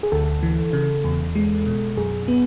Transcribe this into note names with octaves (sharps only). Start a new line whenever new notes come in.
G#4
D2 A4
E3
C#3
E2
G#3
B2
F#2 G#4
B3